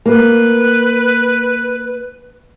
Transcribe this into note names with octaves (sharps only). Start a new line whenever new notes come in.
A#3 B4